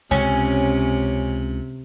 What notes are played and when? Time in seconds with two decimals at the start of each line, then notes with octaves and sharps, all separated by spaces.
0.11 C#2 C3 C#4